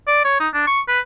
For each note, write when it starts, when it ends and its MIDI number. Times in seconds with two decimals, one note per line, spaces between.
0.07 0.22 74
0.25 0.40 73
0.40 0.48 63
0.54 0.63 62
0.67 0.81 85
0.88 1.00 71